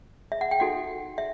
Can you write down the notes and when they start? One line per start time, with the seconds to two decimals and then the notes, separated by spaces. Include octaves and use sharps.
0.32 E5
0.41 F#5
0.51 G5
0.60 D#4 F#4 A4 F#5
1.18 E5